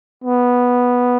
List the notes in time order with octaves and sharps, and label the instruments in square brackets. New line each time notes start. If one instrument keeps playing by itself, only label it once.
[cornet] B3